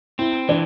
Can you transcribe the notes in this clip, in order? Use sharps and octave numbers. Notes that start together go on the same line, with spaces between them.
C4 E4
E3 D4